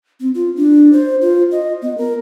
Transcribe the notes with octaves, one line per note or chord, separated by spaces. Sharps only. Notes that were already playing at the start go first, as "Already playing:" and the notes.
C4
F4
D4
C5
F4
D#5
B3
A#4